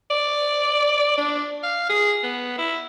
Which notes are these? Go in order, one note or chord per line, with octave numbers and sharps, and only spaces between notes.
D5
D4
F5
G#4
B3
E4